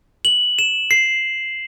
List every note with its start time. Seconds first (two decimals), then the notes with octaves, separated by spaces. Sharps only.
0.25 F#7
0.59 E7
0.91 C7